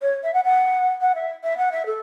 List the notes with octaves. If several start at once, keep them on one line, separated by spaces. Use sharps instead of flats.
C#5
E5
F#5
F#5
F#5
E5
E5
F#5
E5
A4